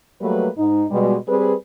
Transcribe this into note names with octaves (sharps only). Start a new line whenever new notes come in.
F#3 G3 A3 A#3 B4
G#2 D#4
B2 G3 G#3
G3 C4 G#4 B4